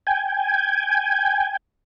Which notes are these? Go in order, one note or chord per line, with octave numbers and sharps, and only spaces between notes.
G5 G#5